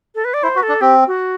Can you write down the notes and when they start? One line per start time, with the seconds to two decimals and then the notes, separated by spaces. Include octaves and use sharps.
0.15 A4
0.25 B4
0.34 D5
0.43 E4 C5
0.55 F#4 B4
0.63 A4
0.69 D4
0.81 C4 G4
1.07 F#4